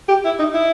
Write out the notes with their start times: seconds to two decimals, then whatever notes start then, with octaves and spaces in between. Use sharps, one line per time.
0.09 G4
0.25 E4
0.39 D#4
0.54 E4